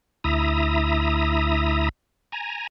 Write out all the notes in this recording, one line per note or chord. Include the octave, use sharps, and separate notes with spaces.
D2 E4 E5 A#5 D#6
G#5 A#5